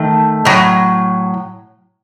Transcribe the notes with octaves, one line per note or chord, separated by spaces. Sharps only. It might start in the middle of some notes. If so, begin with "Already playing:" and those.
Already playing: D#3 A3
A2 F#3